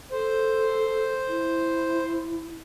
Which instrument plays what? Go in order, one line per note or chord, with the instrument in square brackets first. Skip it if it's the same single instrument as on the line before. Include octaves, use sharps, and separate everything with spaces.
[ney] A4 [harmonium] C5
[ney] E4